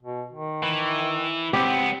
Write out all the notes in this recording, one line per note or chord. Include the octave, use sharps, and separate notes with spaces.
B2
D#3
E3
C#2 B3 C4 G4